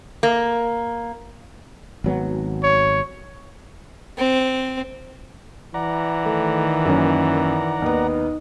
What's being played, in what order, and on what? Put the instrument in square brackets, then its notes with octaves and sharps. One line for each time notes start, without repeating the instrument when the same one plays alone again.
[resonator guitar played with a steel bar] A#3
[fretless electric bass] G#1 F#3 B3
[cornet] C#5
[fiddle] C4
[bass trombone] E3 [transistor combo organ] D5 F#5 A#5
[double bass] D#3 [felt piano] A3
[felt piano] F#2 A#3 C#4
[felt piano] D#2 B3 [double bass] D#4